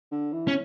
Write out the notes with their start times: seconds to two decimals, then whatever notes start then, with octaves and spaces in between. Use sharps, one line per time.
0.11 D3
0.33 E3
0.48 C#4